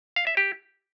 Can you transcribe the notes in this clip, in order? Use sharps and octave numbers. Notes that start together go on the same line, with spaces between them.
F5
E5
G4